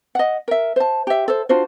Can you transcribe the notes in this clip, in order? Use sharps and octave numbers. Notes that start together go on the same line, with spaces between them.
D#5 F#5
A#4 E5
C5 A5
G4 E5
A4 C5
D4 F4 F#4 C5